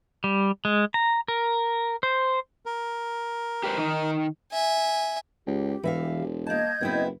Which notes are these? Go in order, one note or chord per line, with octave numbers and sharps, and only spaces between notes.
G3
G#3
A#5
A#4
C5
A#4
G4 B4 C5
D#3 D#4
E5 G#5
C#2 G4
E1 E3 E5 F5
A#3 D#5 A5 G6 G#6
F#1 B3 C4 E4